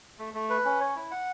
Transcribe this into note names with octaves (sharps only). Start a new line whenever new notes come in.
A3
A3
B4
C#4
C#5
E4
F#5